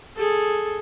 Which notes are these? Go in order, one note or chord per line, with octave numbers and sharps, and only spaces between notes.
G#4 A4